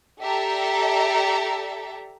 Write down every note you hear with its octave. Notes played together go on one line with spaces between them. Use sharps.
G4 A4 D5 E5 A#5